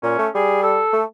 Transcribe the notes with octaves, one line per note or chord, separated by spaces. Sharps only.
A#2 C#4
A3
G3 G#4
A4
A3